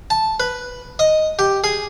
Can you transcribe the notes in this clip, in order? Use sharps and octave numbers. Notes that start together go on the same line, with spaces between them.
A5
B4
D#5
G4
G#4